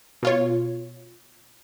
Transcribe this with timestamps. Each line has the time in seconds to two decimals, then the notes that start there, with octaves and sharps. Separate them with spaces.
0.23 B2 F4 C#5